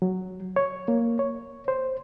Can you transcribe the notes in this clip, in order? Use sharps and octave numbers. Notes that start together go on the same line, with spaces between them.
F#3
C#5
A#3
C#5
C5